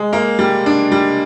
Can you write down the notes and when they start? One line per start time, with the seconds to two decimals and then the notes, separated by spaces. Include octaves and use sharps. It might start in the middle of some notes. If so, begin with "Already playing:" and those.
Already playing: G#3
0.13 A#3
0.39 G3
0.66 D4
0.92 G3